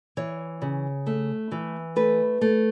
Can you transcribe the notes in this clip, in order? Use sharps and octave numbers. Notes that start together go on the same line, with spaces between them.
E3 C#5
C#3
A3
E3
A3 B4
A3